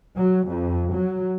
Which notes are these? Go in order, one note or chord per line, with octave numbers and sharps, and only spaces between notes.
F#3
F2
F#3